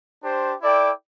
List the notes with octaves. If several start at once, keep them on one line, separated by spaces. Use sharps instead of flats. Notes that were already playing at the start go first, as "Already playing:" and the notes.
D4 G4 C5
E4 A4 D5 G5